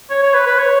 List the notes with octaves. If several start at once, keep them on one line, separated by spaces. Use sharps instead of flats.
C#5
C#5
B4
B4
C#5